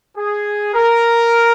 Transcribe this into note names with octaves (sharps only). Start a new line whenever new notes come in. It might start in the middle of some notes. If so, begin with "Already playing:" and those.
G#4
A#4